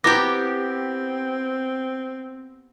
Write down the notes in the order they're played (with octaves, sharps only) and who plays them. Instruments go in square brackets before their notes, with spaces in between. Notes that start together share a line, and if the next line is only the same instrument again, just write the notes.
[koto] B3 G4 [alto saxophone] C4 [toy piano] E4 D6 [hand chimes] A#6